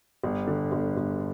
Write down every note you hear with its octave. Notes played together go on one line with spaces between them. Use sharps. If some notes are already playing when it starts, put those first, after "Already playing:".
G1
D3
G1
G1